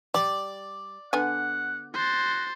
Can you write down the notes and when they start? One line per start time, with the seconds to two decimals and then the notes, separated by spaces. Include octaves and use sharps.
0.14 G3 D5
1.13 D3 B3 F#5 G#5
1.94 F#4 C5 A6